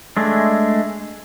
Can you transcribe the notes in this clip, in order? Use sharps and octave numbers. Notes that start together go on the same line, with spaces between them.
G#3 A3 D4